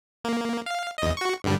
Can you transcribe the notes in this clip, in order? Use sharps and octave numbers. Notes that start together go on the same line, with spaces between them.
A#3
F5
E2 D#5
F#4 C#6
G2 D3 G3